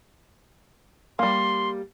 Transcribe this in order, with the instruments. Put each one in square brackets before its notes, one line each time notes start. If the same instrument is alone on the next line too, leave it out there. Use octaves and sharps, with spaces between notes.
[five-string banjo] G3 A#3 [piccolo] C6